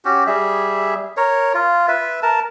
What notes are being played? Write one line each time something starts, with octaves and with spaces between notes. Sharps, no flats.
C#4 F#4 G4
G3 G#4 E5
A#4 C#5
F4
B4 E5
A#4 A5